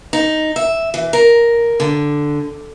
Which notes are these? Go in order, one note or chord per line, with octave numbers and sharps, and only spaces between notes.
D#4
E5
E3
A#4
D3